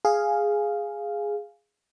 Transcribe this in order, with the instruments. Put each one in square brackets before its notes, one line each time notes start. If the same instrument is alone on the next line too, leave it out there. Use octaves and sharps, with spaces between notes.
[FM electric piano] G#4 F5